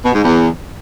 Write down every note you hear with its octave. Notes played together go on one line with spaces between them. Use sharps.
B2
G#2
E2